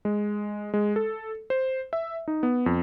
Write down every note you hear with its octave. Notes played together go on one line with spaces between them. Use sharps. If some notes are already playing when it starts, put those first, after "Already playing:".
G#3
G#3
A4
C5
E5
D#4
B3
F2